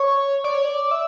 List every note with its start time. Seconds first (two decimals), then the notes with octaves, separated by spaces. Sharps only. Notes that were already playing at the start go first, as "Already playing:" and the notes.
Already playing: C#5
0.44 D5
0.54 C#5
0.65 D5
0.91 E5